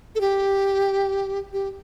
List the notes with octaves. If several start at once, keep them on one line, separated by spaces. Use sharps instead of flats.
A4
G4
G4